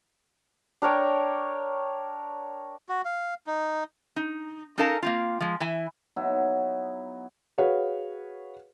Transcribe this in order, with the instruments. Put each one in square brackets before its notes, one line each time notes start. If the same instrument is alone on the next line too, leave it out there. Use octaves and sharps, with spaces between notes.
[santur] D4 A#4 C#5 G5
[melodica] F#4
F5
D#4
[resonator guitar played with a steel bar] D#4
C#4 D#4 A4 A#4 F5 A5
A#3 C4 F4
F3 G#3
E3 E4 G#5
[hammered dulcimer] F#3 B3 D#4 E4
[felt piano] F#4 G#4 B4 C#5 F5 F#5